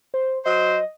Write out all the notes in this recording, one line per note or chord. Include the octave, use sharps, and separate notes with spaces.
C5
F#3 C5 D#5